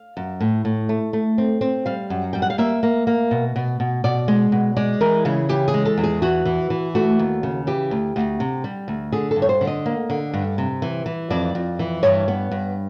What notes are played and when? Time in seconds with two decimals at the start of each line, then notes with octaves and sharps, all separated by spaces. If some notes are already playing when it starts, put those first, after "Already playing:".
Already playing: F5
0.17 F#2
0.40 A2
0.65 A2
0.89 A3
1.13 A3
1.38 C4
1.61 C4
1.86 G3 F5
2.10 F#2
2.33 G3 G5
2.42 F#5
2.50 F5
2.58 A#3 E5
2.83 A#3
3.07 A#3
3.31 B2
3.56 B2
3.80 B2
4.04 B2 D5
4.28 G#3
4.52 B2
4.76 G#3 D5
5.01 E3 A#4
5.25 C#3 G#4
5.49 E3 G4
5.68 G#4
5.74 G#3
5.85 A4
5.98 E2
6.03 G#4
6.22 E3 F#4
6.45 E3
6.70 E3
6.95 A3 F#4
7.19 D#2
7.43 C#3
7.67 E3 G4
7.91 D2
8.16 D2
8.40 C3
8.64 G3
8.88 D2
9.12 D3 G#4
9.31 A4
9.36 G2
9.42 C#5
9.49 C5
9.61 D3
9.67 D#5
9.86 A#3
10.10 D3
10.34 G2
10.58 C3
10.82 E3
11.06 E3
11.30 F2 D5
11.55 F2
11.79 E3
12.03 G2 C#5
12.28 B3
12.51 G2